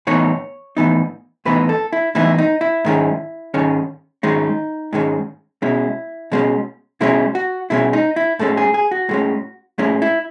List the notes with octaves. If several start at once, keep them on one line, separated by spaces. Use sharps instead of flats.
A2 E3 B3 D#4 C#5
A2 E3 B3 D#4
A2 E3 B3 D#4 B4
A4
E4
A2 E3 B3 D#4 E4
D#4
E4
G#2 D#3 G#3 C#4
G#2 D#3 G#3 C#4
G#2 D#3 G#3 C#4 D#4
G#2 D#3 G#3 C#4
B2 G#3 C#4 E4
B2 G#3 C#4
B2 G#3 C#4 E4
F#4
B2 G#3 C#4 E4
D#4
E4
A2 G#3 C#4 A4
G#4
G#4
F#4
A2 G#3 C#4
A2 G#3 C#4 E4
E4